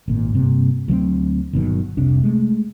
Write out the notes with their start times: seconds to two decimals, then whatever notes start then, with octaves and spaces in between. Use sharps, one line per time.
0.08 G#1 A#2
0.33 G2 C3 A#3
0.88 D2 F#3 B3 C4
1.53 G1 B2 D#3 F#3
1.97 F1 C2 C3 D4
2.23 G#3 A3